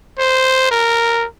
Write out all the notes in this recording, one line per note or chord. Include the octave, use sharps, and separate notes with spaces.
C5
A#4